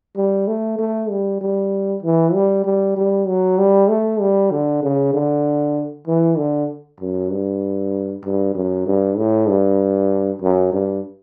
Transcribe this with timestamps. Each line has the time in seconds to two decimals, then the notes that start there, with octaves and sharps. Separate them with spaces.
0.17 G3
0.48 A3
0.79 A3
1.10 G3
1.41 G3
2.03 E3
2.34 G3
2.65 G3
2.97 G3
3.27 F#3
3.58 G3
3.89 A3
4.21 G3
4.52 D3
4.83 C#3
5.14 D3
6.07 E3
6.38 D3
7.00 F#2
7.32 G2
8.25 G2
8.55 F#2
8.86 G2
9.18 A2
9.49 G2
10.42 F#2
10.73 G2